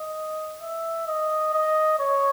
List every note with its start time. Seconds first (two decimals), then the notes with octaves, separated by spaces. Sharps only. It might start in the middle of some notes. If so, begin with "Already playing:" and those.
Already playing: D#5
0.61 E5
1.08 D#5
1.54 D#5
1.99 C#5